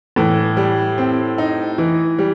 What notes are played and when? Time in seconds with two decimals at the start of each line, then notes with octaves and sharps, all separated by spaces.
0.16 A2 E3
0.57 G3
0.98 C4
1.38 D#4
1.78 E3
2.19 G3